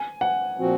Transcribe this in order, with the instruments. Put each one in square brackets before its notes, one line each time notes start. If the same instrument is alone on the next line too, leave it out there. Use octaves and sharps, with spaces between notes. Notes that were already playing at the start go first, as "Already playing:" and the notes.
Already playing: [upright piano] G#5
F#5
[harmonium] A#2 F3 C4 F#4